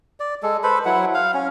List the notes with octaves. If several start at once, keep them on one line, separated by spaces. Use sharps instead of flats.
D5
G#3 A4
A4 B4 C5 B5
F#3 E4 F#5
F5
C#4